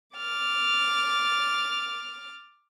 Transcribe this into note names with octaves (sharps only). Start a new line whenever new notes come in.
D6 F6 A6